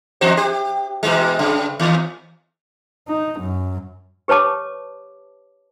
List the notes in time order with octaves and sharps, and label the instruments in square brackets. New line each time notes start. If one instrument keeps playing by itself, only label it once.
[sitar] E2 F#4 C5
G4
B2 E3 G#3
G2 C#3
D#2
[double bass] D#4
F#2
[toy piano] G4 B4 C#5 A5 D6